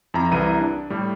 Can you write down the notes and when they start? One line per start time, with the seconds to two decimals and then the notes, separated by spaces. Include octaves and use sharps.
0.14 F2 E4 A#5
0.31 C2 E3 E4 A#5 D#7
0.61 D4
0.90 A2 G3